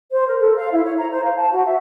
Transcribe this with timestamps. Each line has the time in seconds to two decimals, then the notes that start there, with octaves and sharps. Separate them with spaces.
0.11 C5
0.27 A#4
0.40 A4
0.56 F5
0.72 E4
0.84 C#5
0.98 A#5
1.11 C5
1.23 F5
1.36 A5
1.51 F#4
1.66 E5